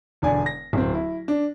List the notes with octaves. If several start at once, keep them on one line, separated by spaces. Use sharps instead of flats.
E1 D3 D5 G#5
A#6
D1 C4
E4
D4